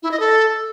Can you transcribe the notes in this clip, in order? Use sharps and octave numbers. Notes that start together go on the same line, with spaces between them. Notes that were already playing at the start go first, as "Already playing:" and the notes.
E4
D#5
A4